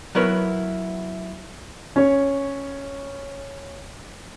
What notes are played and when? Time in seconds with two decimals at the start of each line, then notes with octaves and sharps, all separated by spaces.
0.15 F#3 B3 E4 A#4 B4 C#5
1.96 C#4 C#5